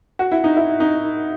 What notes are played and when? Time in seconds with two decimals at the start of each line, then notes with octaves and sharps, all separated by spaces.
0.19 F#4
0.32 E4
0.44 D#4
0.57 E4
0.80 D#4